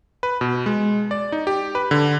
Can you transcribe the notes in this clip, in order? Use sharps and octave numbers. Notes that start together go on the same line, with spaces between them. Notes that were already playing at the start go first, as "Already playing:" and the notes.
B4
B2
G#3
D5
D#4
G4
B4
D3